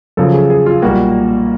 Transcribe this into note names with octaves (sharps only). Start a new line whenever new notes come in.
F#2 C#3 F3 A4
G#4
G#4
F4
B1 A#2 G3 A#3 F#4